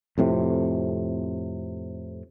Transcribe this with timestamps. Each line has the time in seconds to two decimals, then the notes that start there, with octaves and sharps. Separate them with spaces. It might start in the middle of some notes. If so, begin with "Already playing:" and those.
0.18 F2 A2 C3